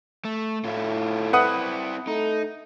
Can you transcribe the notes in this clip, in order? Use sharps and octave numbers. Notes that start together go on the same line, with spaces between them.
A3
A2 A3 E4 F4
C4 E4 B4 F#5 D#6
A3 D#4